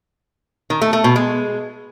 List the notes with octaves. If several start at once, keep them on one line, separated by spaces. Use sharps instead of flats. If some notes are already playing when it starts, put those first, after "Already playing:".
D#3
A3
A3
B2
G#3